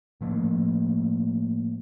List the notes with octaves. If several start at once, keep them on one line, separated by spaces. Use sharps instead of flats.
A2 F3 A3 A#3